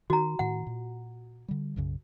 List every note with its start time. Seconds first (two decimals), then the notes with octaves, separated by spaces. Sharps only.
0.10 D#3 F#4 A#5
0.39 A2 D#3 F#5
0.67 A#2
1.48 D3 G3
1.76 B1 F#2 C#3